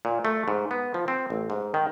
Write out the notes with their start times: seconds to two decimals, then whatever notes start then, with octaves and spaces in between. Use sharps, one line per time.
0.05 A#2
0.25 A3
0.48 G#2
0.71 B3
0.94 F3
1.08 C4
1.30 A1
1.50 G#2
1.74 D#3